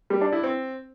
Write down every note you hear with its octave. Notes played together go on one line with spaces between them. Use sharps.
G3
D4
E4
C4